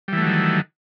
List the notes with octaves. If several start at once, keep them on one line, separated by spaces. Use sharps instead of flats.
D#3 E3 F#3 G3 A3